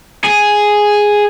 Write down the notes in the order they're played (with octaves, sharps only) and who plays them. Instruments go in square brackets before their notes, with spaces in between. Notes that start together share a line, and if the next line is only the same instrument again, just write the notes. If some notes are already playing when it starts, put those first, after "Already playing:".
[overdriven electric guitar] G#4